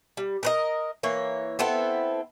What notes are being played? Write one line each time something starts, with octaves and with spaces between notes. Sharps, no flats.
G3
A#4 B4 D#5
E3 A#3 C#5
B3 C4 E4 A4